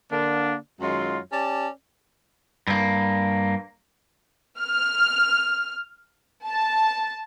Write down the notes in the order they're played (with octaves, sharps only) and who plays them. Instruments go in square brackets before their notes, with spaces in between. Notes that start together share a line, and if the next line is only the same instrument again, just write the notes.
[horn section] D3 A#3 D4
F#2 D#3 F#3 G#3 F4 C6
C#4 G4 D5 A5
[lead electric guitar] G2 A#3
[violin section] F6
A5